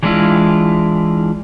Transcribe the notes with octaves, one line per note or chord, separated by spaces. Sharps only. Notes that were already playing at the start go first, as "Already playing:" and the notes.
E3 F#3 G#3 D4 E4 F4